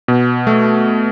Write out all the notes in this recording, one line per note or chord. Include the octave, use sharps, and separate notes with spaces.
B2
A3